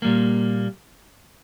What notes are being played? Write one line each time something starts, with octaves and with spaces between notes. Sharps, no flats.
A#2 G3 A#3